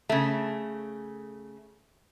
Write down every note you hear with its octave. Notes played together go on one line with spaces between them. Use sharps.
C#3 A3